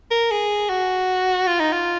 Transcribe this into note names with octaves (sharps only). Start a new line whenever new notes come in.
A#4
G#4
F#4
F4
D#4
F4